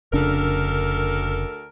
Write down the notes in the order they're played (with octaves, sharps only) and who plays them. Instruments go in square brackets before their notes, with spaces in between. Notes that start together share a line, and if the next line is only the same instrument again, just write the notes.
[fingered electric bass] F1 C#3 D4 [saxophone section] D2 A4 A#4